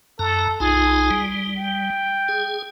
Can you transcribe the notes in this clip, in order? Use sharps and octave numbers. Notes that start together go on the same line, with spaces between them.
F#2 A4 A#5
B1 D#4 F4 G#4
G3
G5
G#4